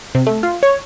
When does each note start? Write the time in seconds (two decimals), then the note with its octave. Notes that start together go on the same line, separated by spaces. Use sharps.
0.15 C3
0.27 A3
0.43 F4
0.63 C#5